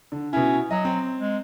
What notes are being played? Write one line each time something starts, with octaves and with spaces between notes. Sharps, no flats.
D3
B2 C#4 E4
F#3 D#5
C4
G#3